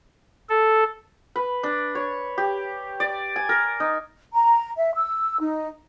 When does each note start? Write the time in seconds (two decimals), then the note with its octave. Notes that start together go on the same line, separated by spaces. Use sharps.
0.49 A4
1.36 B4
1.63 D4
1.95 C#5
2.38 G4
3.00 D5
3.36 G#5
3.49 A#4
3.80 D#4
4.33 A#5
4.77 E5
4.94 E6
5.40 D#4